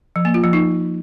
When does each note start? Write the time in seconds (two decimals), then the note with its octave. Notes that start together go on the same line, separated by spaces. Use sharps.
0.16 F3
0.25 A#3
0.34 F4
0.44 F3
0.53 D#4